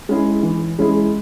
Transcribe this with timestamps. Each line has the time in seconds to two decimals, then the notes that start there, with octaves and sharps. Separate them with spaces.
0.09 G#3 C#4 E4 G#4
0.43 E3
0.79 G#3 C#4 E4 G#4